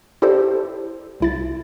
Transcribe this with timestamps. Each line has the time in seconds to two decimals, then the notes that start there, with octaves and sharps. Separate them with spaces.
0.22 E4 G4 A4 C5 D5
1.20 C2 E4 A6